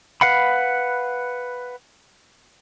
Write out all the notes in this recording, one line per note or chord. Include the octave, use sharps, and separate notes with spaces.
B4 F5 F#5 B5